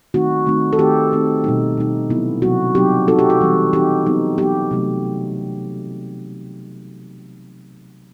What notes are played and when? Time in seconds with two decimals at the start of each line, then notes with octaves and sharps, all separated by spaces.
0.14 D#3 A3 C4 D#4 F#4
0.46 D#3 A3 C4 D#4
0.73 A4
0.79 D#3 A3 C4 D#4 G4
1.12 D#3 A3 C4 D#4
1.44 B2 G3 D#4
1.77 B2 G3 D#4
2.09 C3 F#3 B3 E4
2.42 C3 F#3 B3 E4 F#4
2.75 F#3 C4 D#4 G4
3.08 F#3 C4 D#4 F#4 A4
3.19 G4
3.30 F#4
3.41 E3 G3 C4 D#4
3.73 E3 G3 C4 D#4 G4
4.06 F#3 B3 D#4
4.38 F#3 B3 D#4 G4
4.71 C3 F#3 A3